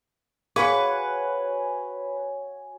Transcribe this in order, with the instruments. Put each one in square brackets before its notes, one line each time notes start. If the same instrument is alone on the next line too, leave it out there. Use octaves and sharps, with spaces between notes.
[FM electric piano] F#4 C#5 G#5 [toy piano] G#4 F5 [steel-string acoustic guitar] B4 F#5